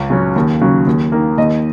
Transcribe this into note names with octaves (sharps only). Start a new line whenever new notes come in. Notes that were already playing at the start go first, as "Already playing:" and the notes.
Already playing: C#2
C#3 F#3 C#4
D#2
C#3 F#3
D#2
D#3 A#3
D#2 D#5